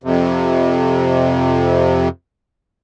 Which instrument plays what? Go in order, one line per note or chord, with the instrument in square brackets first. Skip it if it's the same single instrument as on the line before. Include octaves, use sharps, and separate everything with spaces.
[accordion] F2 C3